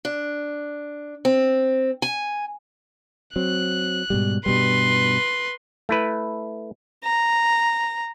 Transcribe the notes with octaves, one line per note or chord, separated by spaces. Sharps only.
D4
C4
G#5
F#3 C4 F#6
G#2 B2 G3
G2 B2 G3 B4 C6
A3 E4 B4
A#5